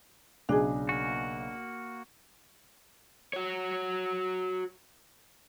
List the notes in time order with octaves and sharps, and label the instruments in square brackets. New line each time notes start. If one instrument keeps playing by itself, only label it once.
[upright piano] B1 C#3 [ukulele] D4 G#4
[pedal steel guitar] A#3 F#4
[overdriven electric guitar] F#4 C#5